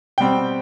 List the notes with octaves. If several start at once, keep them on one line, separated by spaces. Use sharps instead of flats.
B2 G3 C4 G5